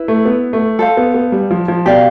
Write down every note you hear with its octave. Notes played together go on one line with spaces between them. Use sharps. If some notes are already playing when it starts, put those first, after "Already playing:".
Already playing: E4 B4 E5
A3
B3
A3
A4 C5 F5
B3
B3
G3
F3
F3
B2 G4 D5 F5